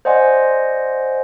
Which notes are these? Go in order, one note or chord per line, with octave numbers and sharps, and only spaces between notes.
C5 D5 D#5 F#5 G#5 C6